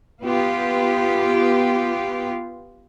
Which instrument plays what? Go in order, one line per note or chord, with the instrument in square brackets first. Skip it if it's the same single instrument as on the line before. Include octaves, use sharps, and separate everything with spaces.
[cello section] B3 F4 G4